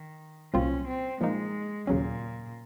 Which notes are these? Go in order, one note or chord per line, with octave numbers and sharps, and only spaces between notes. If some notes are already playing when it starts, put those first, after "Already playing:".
Already playing: D#3
C2 A#2 F#3 C4 C#4 F4
C4
A#2 F3 G#3 A#3 D#4
D#2 A#2 C#3 F#3 C#4